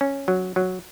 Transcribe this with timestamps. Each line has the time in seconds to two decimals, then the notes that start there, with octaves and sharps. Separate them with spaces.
0.01 C#4
0.28 F#3
0.56 F#3